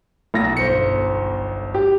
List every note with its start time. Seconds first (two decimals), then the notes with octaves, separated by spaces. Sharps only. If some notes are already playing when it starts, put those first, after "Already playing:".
0.34 B1 A#6
0.57 G1 C5 C#7
1.74 G4